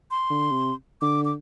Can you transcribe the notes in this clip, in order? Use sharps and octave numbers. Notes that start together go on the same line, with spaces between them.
C6
D3
C3
D3 D6
D6